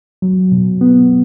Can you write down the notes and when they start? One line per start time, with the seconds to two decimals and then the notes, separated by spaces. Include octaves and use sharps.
0.22 F#3
0.52 B2
0.81 B3